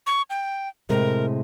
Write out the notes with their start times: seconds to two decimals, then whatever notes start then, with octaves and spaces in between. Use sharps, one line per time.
0.07 C#6
0.30 G5
0.89 A2 C3 G#3 A#4